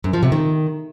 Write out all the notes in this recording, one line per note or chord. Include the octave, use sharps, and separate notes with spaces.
F#2
F3
C3
D#3